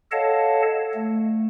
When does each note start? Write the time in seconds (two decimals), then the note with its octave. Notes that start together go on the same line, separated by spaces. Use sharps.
0.12 A4 C#5 D#5 F5 F#5 A5
0.94 A3